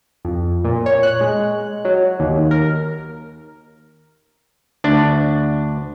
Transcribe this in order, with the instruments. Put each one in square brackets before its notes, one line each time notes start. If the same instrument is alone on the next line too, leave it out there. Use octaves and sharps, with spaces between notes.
[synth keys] F2
A#2
C#5
F#6
G#3
F#3
D#2
A#4
[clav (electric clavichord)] D2 D4